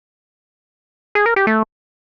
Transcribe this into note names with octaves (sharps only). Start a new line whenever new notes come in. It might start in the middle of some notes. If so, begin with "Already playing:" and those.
G#4
A#4
G4
A3